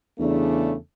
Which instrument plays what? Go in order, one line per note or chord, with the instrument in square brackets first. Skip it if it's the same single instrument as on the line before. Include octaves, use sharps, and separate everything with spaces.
[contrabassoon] E2 [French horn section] C#3 A3 D4